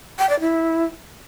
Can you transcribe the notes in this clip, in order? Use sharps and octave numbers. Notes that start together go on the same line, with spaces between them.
G5
D5
E4